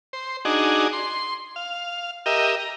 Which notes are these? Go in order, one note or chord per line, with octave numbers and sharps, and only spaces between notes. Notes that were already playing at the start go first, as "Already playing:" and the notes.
C5
D4 D#4 F#4 G#4
C6
F5
G4 A#4 D#5 E5
A#5